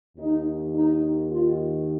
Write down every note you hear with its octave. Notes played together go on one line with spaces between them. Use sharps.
D#2 D#3 D#4
D#4
F4